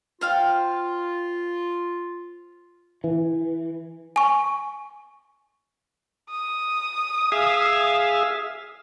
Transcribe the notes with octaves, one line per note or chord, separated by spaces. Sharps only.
F4 C5 F5 G5
E3
G#5 C#6
D#6
G#4 E5 F5